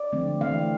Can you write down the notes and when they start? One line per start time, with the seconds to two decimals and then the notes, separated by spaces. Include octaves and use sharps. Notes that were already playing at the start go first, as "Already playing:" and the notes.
Already playing: D5
0.12 D3 F3 A3 C4
0.41 E3 A3 C4 F5